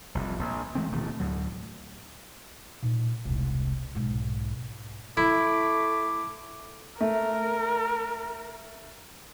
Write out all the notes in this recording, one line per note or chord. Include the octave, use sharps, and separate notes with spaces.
F1 C2
A#1
E3 G#3 A3 C4
D1 B2 D#3 A3
D2 A2 F#3
A#2 D#4
E1 C2
B1 G#2
A3 E4 D6
A3 A#4